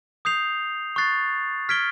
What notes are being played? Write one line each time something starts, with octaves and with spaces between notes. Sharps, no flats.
D#6 G6 C7 F7
C#6 F#6 A6 C7
F6 G#6 B6 D7 G7